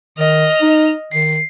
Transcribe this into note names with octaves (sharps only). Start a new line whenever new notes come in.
D#3 D#5 F6
D#4
D#3 C7